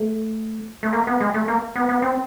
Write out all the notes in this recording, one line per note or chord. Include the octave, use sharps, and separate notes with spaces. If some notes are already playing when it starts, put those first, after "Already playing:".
Already playing: A3
A3
A#3
B3
G#3
A3
A#3
B3
B3
C4